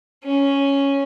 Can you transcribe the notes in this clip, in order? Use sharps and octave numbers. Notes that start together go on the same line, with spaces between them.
C#4